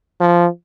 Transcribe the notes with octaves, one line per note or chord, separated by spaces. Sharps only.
F3